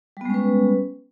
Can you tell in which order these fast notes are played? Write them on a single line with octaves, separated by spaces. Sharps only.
G3 B3 G#3 C#4 B4